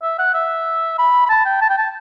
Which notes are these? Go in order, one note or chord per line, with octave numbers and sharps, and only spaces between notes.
E5
F#5
E5
B5
B5
A5
G5
A5
G5
A5